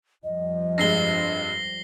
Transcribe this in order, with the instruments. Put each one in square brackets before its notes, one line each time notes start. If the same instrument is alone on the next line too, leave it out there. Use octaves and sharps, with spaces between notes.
[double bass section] F2 F3 G3 [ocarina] D#5
[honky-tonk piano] G2 G#3 [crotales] A#6 C7 G7